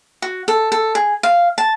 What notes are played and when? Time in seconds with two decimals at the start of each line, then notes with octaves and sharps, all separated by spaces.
0.22 F#4
0.48 A4
0.72 A4
0.95 G#4
1.23 F5
1.58 A5